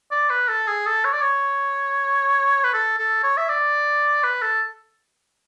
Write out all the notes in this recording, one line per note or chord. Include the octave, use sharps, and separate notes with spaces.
D5
B4
A4
G#4
A4
C#5
D5
C#5
B4
A4
A4
C#5
E5
D5
B4
A4